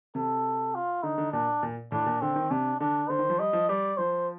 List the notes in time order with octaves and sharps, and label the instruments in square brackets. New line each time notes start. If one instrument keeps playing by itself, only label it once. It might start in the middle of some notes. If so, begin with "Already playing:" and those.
[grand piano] C3 [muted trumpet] A4
[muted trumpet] F4
[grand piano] D3 [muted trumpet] D#4
[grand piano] D3
[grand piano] A#2 [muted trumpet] D4
[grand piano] A#2
[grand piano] A2 [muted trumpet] D4
[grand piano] A#2
[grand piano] D3 [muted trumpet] C4
[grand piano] D#3
[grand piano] C3 [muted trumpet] D4
[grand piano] D3 [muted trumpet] D4
[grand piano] D3 [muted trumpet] C5
[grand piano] D#3
F3
[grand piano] G3 [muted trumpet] D#5
[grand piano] F3
[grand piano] G3 [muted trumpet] D5
[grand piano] F3 [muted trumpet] C5